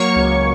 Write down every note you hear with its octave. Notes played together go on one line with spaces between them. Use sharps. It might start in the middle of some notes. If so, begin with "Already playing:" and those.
Already playing: F#3 A#3 C#5 C#6
C#2